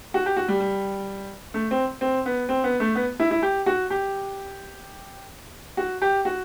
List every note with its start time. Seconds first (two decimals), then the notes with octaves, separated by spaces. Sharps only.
0.14 F#4
0.26 G4
0.37 F#4
0.48 G3
0.60 G3
1.54 A3
1.71 C4
2.01 C4
2.26 B3
2.49 C4
2.64 B3
2.80 A3
2.95 B3
3.20 E4
3.31 E4
3.42 G4
3.66 F#4
3.90 G4
5.77 F#4
6.02 G4
6.25 F#4